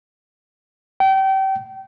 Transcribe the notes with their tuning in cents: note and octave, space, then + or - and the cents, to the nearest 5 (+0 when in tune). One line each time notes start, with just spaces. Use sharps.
G5 -30